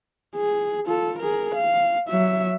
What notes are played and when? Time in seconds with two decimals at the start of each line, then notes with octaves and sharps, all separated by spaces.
0.36 G#4
0.86 F4 A4
1.19 G#4 A#4
1.55 F5
2.09 F#3 E5